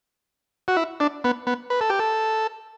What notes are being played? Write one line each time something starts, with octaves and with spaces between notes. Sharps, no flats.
F#4
E4
D4
B3
B3
B4
A4
G4
A4